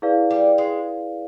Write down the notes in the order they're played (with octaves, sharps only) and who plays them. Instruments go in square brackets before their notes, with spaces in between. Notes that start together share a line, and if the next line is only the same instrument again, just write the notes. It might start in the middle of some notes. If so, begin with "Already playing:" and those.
[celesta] E4 G#4 B4 D5 F5
[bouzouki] G3
G#3